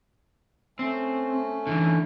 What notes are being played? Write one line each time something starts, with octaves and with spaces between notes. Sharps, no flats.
A3 C4 C#4
D3 E3